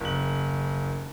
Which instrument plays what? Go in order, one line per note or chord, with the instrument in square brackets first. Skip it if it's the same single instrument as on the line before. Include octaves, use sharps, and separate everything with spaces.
[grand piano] F#1 F#7